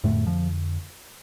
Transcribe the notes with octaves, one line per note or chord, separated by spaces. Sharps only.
F2 A2 D3 A3
F3